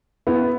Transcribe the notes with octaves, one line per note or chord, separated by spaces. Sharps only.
B3 E4